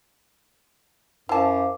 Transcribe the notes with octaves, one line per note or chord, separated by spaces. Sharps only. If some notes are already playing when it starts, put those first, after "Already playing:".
F#2 E4 C5 F5 A5 D6